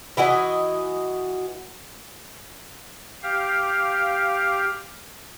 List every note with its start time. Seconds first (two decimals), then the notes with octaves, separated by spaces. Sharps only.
0.17 E3 E4 F#4 D#5
3.23 G4 F5